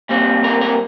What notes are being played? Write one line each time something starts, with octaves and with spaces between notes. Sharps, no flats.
A#2 G3 C4
A#4
A#4